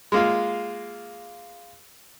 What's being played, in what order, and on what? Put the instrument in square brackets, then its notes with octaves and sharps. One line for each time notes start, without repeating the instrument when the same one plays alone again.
[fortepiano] G#3 A#3 F4